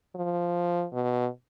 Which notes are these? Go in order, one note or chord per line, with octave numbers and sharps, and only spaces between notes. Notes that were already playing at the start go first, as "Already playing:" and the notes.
F3
B2